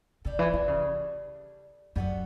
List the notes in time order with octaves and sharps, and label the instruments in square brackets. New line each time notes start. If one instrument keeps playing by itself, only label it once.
[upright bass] C#3 [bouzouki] G3 D4 A4
[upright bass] E3
E3
C#3
[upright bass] F#2 [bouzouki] G3 B3 F#4 A4